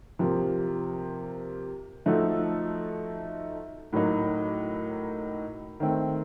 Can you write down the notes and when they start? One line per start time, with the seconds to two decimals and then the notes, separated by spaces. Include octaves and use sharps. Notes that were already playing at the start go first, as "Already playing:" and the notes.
0.19 C3 F3 A#3
2.06 F3 A3 D#4 F#4 A4
3.93 A2 F#3 A#3 D#4 F#4
5.80 D#3 A3 C4